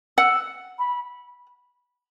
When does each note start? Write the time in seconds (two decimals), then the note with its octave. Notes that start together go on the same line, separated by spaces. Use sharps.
0.17 F#5 E6
0.79 B5